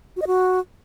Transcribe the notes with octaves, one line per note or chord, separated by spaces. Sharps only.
F#4
D#5
F#4